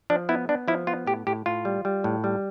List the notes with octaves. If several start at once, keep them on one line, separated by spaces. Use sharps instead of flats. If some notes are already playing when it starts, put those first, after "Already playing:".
F3 D4
B3 E4
B3 D4
F3 E4
B3 F4
A2 G4
A2 G4
A2 F4
G3
G3
A2
G3